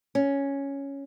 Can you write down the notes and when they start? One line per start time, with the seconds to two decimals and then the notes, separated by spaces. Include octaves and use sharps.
0.15 C#4